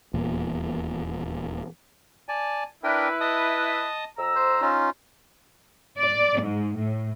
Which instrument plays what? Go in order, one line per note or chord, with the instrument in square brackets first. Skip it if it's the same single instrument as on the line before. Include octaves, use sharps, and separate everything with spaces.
[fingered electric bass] D#1 E2 A#2
[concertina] D5 G#5 A5
[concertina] D4 A#4 G5 [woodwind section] E4 B4
[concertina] D#5 A5 D#6
[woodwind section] F2 A#5 E6
[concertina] C5
C#4 D#4 F4
[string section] D5
G#2
A2